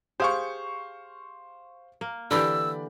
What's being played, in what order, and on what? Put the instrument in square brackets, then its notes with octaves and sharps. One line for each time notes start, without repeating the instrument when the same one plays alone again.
[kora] G4 G#4 [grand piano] C5 F5 C#6
[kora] A#3
[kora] D3 E3 G4 [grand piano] D5 B5 [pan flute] E6